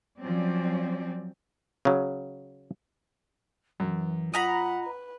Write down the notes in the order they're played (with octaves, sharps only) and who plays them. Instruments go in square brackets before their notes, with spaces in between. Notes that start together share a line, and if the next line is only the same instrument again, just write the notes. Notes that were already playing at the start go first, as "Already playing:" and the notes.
[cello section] F3 F#3 C4 C#4 D5
[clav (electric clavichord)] C#3 F#3
[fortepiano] F#2 [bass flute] E3
[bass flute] F4 [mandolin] D#5 A#5 B5 [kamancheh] F#5
[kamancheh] B4